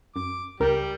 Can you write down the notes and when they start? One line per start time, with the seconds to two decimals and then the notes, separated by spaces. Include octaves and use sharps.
0.16 F#2 D6
0.60 C#2 G3 G4 A#4